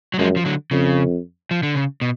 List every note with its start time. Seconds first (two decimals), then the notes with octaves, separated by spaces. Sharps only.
0.14 F#3
0.19 F#2 F3 G#3
0.36 F3
0.45 D3 F#3
0.71 F2 C#3
1.51 F3
1.63 D3
1.75 C#3
2.01 B2